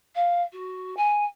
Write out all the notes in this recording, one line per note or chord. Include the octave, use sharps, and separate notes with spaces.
F5
F#4
G#5